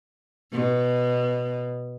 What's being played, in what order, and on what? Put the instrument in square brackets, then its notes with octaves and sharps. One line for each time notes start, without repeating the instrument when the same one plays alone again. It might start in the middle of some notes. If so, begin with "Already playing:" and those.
[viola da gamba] B2